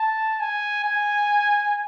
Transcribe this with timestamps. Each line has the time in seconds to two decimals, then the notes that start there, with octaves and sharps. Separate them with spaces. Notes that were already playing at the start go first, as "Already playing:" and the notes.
Already playing: A5
0.40 G#5
0.85 G#5